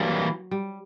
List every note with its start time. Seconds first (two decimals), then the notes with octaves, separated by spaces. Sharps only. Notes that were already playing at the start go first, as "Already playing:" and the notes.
Already playing: E3 F#3 G3 A#3
0.51 G3